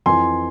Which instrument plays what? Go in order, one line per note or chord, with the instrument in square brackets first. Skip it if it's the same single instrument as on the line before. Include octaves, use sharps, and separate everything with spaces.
[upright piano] F2 E3 G#5 C6